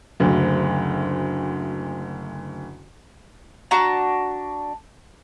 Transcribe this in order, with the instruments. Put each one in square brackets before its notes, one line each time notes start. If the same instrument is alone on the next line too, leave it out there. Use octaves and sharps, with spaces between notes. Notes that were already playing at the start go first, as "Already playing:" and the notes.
[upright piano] F#1 D2
[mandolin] D4 F#4 A5 A#5